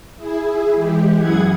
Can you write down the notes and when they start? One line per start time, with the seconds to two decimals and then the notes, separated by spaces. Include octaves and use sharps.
0.17 E4 G#4
0.74 E3 G#3 G4
1.17 F#2 E4 G#4 F#5 G#6